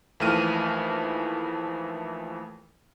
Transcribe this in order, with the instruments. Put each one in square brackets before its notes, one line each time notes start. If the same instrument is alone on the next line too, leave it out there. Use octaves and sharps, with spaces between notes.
[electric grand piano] D#2 E3 F3 A3 F6 D#7